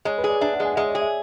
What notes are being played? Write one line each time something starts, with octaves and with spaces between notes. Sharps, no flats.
G#3 C#5
B4
G#4
D5
D4 E5
F#5
G#3
G#5
F#5
G#3 E5
C#5
D5
G#4
E5